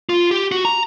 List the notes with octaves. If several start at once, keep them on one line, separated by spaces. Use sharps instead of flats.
F4
G4
F#4
A#5